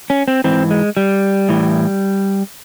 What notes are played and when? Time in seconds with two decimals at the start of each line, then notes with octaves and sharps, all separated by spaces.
0.10 C#4
0.28 C4
0.44 G#2 E3 C4
0.70 G#3
0.97 G3
1.49 A2 E3